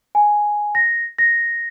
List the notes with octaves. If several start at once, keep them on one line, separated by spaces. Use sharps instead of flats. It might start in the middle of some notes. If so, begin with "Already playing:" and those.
G#5
A#6
A#6